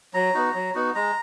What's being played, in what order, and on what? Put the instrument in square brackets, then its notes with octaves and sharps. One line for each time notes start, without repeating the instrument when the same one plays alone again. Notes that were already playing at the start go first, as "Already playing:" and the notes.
[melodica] F#3 A#5
B3 D#4 F#4
F#3
B3 D#4 F#4
G#3 A#5